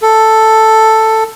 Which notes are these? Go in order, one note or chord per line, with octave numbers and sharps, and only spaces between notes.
A4